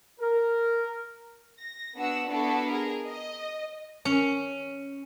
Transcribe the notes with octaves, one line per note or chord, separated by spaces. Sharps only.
A#4
A#6
B3 D4 F#4 F#5 E6
B3 D4 E4 F#4 A4
G#4 A#4
D#5
C#4